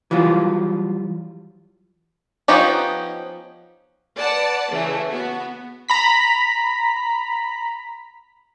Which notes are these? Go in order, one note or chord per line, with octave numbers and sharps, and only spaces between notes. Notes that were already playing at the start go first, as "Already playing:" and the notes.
E3 F#3 G3 F4
F3 B3 C#4 D#4 G4
B4 D5 F#5 A5
C#3 E3 A3
B3 F#4
A#5 B5 B6